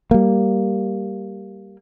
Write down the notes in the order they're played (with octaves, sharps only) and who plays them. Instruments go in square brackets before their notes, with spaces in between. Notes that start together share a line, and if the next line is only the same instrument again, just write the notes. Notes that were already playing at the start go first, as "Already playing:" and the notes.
[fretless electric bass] G3 A#3